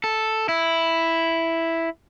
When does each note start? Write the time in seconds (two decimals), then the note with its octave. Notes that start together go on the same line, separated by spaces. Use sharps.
0.04 A4
0.49 E4